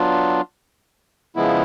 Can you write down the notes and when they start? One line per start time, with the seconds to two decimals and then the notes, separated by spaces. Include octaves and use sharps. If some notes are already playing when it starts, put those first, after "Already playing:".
Already playing: F#3 B3 D4 F4
1.36 C#3 F3 G#3 B3 E4